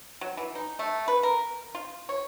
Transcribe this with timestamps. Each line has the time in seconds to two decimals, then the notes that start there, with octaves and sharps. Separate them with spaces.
0.21 F#3
0.37 E3
0.55 D#4
0.79 A3
1.08 B4
1.23 A#4
1.75 F4
2.09 C#5